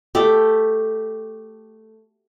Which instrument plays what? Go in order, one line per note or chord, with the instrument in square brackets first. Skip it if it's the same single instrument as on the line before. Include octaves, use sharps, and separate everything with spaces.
[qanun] A3 G4